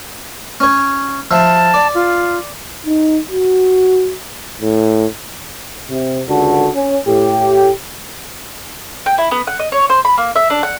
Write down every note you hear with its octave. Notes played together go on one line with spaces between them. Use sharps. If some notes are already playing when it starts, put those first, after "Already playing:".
C#4 C#5
F3 E5 A5
D5
F4
D#4
F#4
A2
C3
C#2 D3 F#4 A4
C#4
A2 G4
G5
E4
B3
F#5
D#5
C#5
C5
B5
A#3
E5
D4
F#5